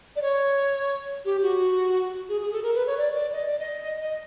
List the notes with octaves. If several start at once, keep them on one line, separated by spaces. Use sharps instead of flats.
D5
C#5
G4
F#4
G#4
G#4
A4
A#4
B4
C#5
D5
D5
D#5
D5
D#5
D#5